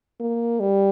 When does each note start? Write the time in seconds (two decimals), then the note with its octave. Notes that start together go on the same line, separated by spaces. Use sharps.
0.20 A#3
0.60 G3